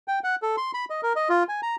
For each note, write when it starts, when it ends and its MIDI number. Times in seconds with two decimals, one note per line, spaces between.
0.08 0.19 79
0.24 0.35 78
0.42 0.56 69
0.57 0.71 84
0.74 0.85 83
0.90 1.01 75
1.03 1.13 70
1.16 1.28 75
1.29 1.43 65
1.49 1.61 80
1.62 1.76 82